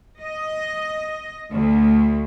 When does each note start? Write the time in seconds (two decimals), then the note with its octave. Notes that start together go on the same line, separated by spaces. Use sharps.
0.21 D#5
1.51 D2